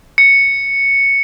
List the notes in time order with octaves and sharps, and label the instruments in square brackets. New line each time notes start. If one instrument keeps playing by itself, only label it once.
[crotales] C#7